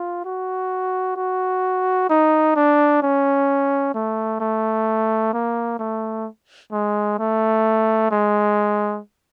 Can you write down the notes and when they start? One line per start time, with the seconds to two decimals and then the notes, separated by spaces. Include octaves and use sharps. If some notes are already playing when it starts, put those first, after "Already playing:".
Already playing: F4
0.25 F#4
1.16 F#4
2.10 D#4
2.56 D4
3.02 C#4
3.94 A3
4.40 A3
5.33 A#3
5.79 A3
6.72 G#3
7.19 A3
8.11 G#3